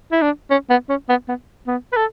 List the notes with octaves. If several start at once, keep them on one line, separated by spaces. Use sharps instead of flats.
E4
D4
C#4
B3
C#4
B3
B3
B3
B4
A4